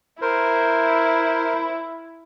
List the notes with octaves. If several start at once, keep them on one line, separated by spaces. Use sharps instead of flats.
E4 A#4 C5